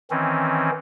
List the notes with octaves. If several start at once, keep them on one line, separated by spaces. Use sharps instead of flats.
D#3 E3 C4 C#4